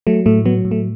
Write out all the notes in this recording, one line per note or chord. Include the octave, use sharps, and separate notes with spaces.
F#3 A3
A2 A3
F#3 B3
A2
A3